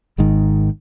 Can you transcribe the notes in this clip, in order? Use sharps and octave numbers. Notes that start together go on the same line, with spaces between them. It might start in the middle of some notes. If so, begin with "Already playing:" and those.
G#1 G#2 D#3